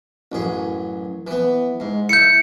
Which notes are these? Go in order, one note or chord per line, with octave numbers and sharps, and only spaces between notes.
A1 F#2 G#4
E3 B3
G#2
E4 E5 G6 C#7